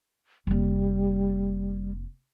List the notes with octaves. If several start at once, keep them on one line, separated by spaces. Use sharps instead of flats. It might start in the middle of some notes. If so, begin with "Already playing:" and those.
F1 G3 A#3